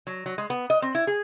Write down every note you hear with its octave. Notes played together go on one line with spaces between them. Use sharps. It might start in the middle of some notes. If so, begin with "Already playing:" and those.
F#3
F#3
G#3
B3
D#5
C4
E4
G#4